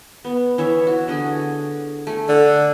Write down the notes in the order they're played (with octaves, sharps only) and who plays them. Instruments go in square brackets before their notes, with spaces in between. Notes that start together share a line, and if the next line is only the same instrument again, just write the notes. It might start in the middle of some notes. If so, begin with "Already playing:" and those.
[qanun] B3
E3 C#5 E5
F#4
D3 F#4 G#4
A3 G#5
[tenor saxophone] D3